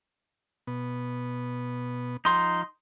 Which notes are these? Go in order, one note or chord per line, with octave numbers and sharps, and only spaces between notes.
B2 B3
F3 D#4 C6